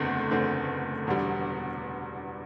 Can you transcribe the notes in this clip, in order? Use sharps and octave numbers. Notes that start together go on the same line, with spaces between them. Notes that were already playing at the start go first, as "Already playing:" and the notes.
Already playing: F#1 E2 D3 A3 C4
F#1 E2 D3 A3 C4
E1 E2 D3 G3